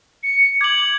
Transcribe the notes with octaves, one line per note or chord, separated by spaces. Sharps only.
C#7
D6 G#6 F#7